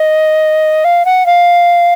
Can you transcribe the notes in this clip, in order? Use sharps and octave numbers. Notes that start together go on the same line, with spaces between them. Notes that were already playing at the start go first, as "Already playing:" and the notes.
Already playing: D#5
F5
F#5
F5